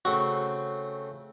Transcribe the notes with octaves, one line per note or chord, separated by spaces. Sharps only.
C#3 A3 C4 F#4